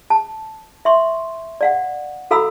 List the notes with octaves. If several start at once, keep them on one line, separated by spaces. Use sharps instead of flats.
A5
E5 C6 C#6
D5 F5 F#5
F#4 A4 F5 A#5 B5 E6